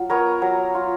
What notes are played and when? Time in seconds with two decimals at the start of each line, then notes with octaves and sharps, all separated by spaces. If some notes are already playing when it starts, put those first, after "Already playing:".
Already playing: F#3 F4
0.10 B3 A#4 C#5
0.42 F#3
0.75 F4